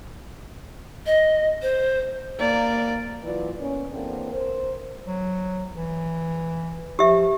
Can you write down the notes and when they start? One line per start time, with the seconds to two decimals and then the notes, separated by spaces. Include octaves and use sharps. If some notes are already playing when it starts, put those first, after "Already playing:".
1.06 D#5
1.62 C5
2.38 A#3 D5
3.23 E3 F#3 F4 B4 D5
3.59 A#3 B3 C#4
3.91 E2 D3 A#3 C4
4.33 A#4 C5
5.07 F#3
5.75 E3
6.99 F3 G4 E5